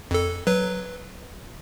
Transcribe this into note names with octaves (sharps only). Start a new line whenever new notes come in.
F2 A4
F#3 B4